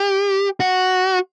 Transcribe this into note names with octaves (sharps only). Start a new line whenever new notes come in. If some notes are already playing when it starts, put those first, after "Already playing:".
Already playing: G4
F#4